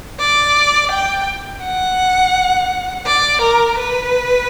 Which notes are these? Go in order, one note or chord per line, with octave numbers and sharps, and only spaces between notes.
D5
G5
F#5
D5
A#4
B4